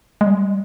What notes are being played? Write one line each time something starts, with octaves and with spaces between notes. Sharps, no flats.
G#3
G3